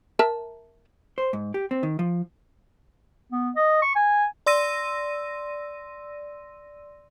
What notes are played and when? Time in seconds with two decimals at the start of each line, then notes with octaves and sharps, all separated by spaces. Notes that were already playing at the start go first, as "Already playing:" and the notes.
0.19 A#4 E5 A5
1.18 C5
1.33 G#2
1.54 G4
1.71 C4
1.83 D#3
1.99 F3
3.32 B3
3.56 D#5
3.82 C#6
3.95 G#5
4.46 D5 C6 E6 A#6 D#7